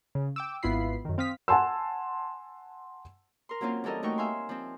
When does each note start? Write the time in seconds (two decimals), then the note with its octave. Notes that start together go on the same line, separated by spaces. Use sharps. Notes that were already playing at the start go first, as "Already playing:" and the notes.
0.15 C#3
0.36 G5 D6 E6
0.63 G#1 B3 E4 F4 B5 C7
1.05 F#2 D#3
1.18 C4 F5 D#6 B6
1.48 F#5 G#5 A5 C6 E6
3.49 A#4 C6
3.61 F#3 A#3 C4 C#4 F4
3.84 E3 G3 A4 A#4 D#5
4.03 A3 D#4 F#4 A#4 G5 C#6
4.18 E5 F5 G#5 C6
4.49 F3 C4